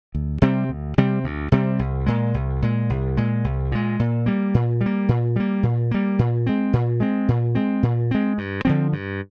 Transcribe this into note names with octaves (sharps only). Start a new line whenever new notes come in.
D2
C3 G3 C4
D2
C3 G3 C4
D2
C3 G3 C4
C2
A#2 G#3
C2
A#2 G#3
C2
A#2 G#3
C2
A#2 G#3
A#2
G3 A#3
A#2
G3
A#3
A#2
G3 A#3
A#2
G3 A#3
A#2
G#3 C4
A#2
G#3 C4
A#2
G#3 C4
A#2
G#3 C4
G2
D3 F3 C4
G2